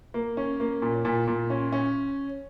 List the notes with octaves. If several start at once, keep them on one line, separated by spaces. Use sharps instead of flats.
A#3
C#4
A#3
A#2
A#2
A#2
C#4
C#4